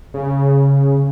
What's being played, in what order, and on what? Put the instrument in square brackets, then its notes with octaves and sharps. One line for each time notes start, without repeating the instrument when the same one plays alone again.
[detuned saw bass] C#3